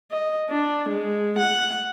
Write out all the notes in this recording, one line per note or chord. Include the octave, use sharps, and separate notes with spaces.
D#5
D4
G#3
F#5